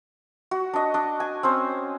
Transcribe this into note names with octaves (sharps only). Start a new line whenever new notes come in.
F#4
D4 D#5
D4 D#5
G#5
C4 C#4 C5